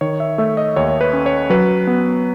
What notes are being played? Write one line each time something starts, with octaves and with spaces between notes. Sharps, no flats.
D#3 C#5
E5
A3 E5
D#5
D#2 C#5
B4
C#4
C#5
F#3 B4
B3